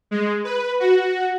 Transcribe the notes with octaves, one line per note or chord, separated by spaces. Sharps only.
G#3
B4
F#4